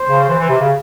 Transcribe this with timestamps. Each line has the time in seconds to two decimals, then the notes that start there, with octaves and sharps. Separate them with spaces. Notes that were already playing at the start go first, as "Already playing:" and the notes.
Already playing: C5
0.08 C#3
0.29 E3
0.39 E3
0.49 C3
0.60 C#3